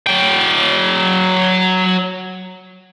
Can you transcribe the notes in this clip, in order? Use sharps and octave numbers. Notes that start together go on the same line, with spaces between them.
F#3 G5